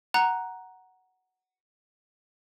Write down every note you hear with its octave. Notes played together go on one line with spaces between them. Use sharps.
F#5 A#5 F#6